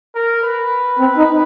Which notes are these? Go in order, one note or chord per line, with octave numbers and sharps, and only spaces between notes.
A#4
B4
C4
D#4